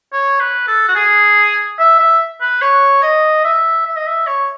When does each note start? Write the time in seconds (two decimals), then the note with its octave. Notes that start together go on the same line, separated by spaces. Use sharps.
0.13 C#5
0.40 B4
0.68 A4
0.88 F#4
0.95 G#4
1.79 E5
2.00 E5
2.41 B4
2.62 C#5
3.03 D#5
3.45 E5
3.87 E5
3.96 D#5
4.07 E5
4.27 C#5